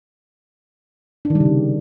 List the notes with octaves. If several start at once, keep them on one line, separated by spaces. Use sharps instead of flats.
D4
D#3
G3
C#3
C3